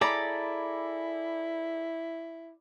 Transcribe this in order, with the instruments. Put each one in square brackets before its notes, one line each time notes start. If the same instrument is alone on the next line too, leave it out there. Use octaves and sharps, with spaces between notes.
[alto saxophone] E4 [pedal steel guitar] G#4 A4 A#5 [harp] D5 B5